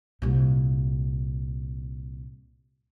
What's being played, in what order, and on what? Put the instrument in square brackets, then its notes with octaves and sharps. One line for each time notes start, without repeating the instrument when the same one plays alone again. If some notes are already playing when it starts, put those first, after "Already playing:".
[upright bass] C2 A#2